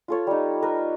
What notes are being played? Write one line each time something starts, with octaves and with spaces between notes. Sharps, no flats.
F4 A4 C#5
G3 D#4
A#4 B4